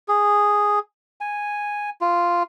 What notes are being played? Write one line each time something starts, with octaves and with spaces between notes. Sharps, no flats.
G#4
G#5
F4